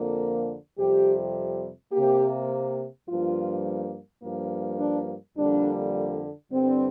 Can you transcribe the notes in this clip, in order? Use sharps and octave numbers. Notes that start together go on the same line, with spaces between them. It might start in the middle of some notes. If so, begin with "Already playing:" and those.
Already playing: F2 D3 F3 A#3
F2 C3 G3 G4
A#3 G4
C3
G2 F3 A#3 F4
G2 F3 A#3
D4
F2 D3 G3 A#3 D4
G2 D3 G3 C4